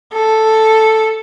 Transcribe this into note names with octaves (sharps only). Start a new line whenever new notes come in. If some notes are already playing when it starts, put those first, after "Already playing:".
A4